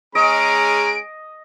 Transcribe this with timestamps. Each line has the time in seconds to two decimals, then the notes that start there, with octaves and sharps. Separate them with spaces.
0.15 G#3 C#4 G#4 D#5 A#5 D7